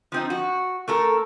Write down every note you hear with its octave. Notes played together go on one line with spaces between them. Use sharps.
F3 C4 D#4
F#4
A3 A4 A#4